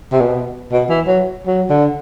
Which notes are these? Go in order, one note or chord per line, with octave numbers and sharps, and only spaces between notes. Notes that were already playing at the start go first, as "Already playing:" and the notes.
C3
B2
B2
E3
F#3
F#3
D3